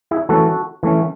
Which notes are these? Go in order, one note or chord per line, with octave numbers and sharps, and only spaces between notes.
E4 G#4
E3 A3 C#4 F#4 A4
E3 A3 C#4